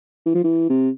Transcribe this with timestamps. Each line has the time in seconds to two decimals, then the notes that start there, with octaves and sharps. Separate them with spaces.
0.26 E3
0.35 F3
0.44 E3
0.69 C3